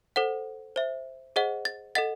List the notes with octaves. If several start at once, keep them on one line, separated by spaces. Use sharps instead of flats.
A4 C5 F#5
C5 E5
G#4 C5 D#5 F#5
A6
A4 D#5 F#5 A6